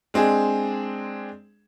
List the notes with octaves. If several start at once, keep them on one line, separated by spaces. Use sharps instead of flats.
G#3 C4 D4 G#4